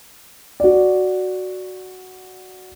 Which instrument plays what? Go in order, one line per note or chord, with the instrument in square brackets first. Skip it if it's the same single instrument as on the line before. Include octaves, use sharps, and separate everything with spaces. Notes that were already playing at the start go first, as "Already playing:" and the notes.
[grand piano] F#4 D5